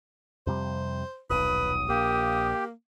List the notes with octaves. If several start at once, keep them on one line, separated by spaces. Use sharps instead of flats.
F2 C3 G3 C5
D#1 B1 B4 D#6
A#1 A#3 G4